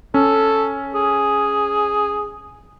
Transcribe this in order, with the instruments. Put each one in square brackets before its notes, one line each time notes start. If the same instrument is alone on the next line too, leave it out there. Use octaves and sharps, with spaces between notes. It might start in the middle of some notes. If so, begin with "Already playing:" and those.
[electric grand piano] C#4 [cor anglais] A4
[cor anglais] G#4